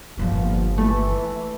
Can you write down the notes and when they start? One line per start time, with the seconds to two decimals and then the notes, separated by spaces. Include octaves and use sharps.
0.18 G1 A#2 F3 B3
0.78 E3 A3